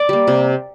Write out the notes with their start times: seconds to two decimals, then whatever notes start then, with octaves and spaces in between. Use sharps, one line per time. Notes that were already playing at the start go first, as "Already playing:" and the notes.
Already playing: D5
0.09 G3 A#3
0.27 C3